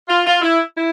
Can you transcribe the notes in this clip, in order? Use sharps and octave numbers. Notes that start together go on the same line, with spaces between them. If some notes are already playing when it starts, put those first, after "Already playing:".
F4
F4
E4
E4